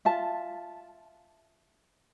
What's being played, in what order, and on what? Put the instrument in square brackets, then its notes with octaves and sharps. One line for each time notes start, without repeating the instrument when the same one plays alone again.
[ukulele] F4 E5 A5